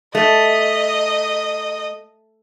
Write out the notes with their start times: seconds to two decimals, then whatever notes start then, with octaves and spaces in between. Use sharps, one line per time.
0.15 A3 D#5